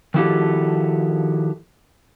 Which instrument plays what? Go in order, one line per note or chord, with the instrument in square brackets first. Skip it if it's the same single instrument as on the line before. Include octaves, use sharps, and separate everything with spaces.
[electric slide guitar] D#3 F3 E4 F#4 G4 A4